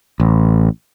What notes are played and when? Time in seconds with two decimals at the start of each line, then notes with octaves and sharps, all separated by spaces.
0.20 A1